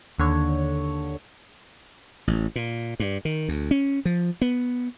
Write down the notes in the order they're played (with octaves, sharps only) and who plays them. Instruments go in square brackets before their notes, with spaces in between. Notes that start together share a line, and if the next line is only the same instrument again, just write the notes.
[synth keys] D#2 D3 C#5
[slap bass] A1
A#2
G2
D#3
D2
C#4
F3
B3